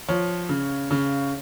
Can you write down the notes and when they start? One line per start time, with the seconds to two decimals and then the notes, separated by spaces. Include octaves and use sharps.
0.09 F3 C#5
0.49 C#3
0.91 C#3